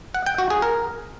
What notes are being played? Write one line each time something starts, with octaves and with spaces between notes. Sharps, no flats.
F#5
G5
F#4
G#4
A#4